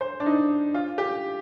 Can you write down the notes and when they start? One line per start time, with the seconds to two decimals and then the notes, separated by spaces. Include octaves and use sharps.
0.01 C5
0.20 D4
0.26 D#4
0.74 F4
0.98 G4